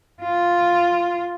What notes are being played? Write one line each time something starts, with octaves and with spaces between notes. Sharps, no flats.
F4